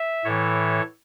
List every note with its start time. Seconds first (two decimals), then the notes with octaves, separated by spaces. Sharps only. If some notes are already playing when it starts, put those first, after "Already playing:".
Already playing: E5
0.25 A2 E3 A4 C#5